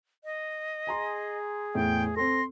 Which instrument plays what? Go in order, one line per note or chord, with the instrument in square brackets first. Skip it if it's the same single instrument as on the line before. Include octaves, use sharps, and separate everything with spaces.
[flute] D#5
[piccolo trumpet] G#4 [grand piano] G#5 A#5 C6
[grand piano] E2 A2 [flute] G5
[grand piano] C4 A4 [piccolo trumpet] C6 [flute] A#6